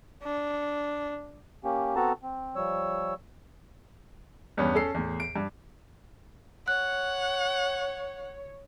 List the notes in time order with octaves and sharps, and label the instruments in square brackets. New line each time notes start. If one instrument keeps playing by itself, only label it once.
[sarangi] D4
[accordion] A#3 C#4 G4
B3 C4 F#4 A4 A5 A#5
C4
F3 G3 C#5 E6
[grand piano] E2 G2 B3 C#4
C#4 A4 C7
E2 A2
D7
G2
[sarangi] C#5 [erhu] F#5 [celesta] F#6